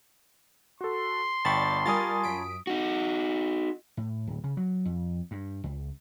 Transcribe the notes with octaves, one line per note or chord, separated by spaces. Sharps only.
F#4 A4 C6
G1 D5 G5 A5 B5 C#6 A6
G3 F4 A#4 G#5 D#6 A6
F#2 B6 D7
D#4 F#4
A2
D1
C#3
F#3
F2
G2
C#2